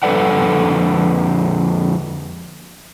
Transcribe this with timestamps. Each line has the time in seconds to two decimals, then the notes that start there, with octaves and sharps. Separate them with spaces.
0.03 F2 D3 A4 B4 D5 F#5